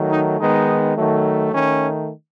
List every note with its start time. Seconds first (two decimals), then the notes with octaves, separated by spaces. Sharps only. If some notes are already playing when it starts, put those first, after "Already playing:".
Already playing: D#3 F#3 A3
0.12 D#4
0.40 D#3 G#3 B3 D#4
0.96 D#3 F#3 A3
1.53 D#3 A3 C#4